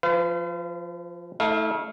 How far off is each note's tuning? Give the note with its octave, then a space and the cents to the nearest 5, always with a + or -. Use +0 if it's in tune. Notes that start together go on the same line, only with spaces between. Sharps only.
F3 +0 B4 +45 F5 -30
A3 +0 E4 -40 F5 +0